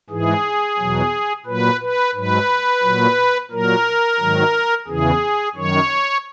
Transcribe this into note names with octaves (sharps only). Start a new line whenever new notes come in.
G#2 E3 G#4
E2 B2 F#3
A#2 F#3 B4
B4
G#2 F#3 B4
A#2 F#3
A#2 F#3 A#4
G#2 D#3 F#3
E2 C#3 E3 G#4
F#2 D#3 F#3 C#5